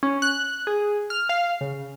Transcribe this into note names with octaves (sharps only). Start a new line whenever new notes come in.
C#4
F#6
G#4
F6
F5
C#3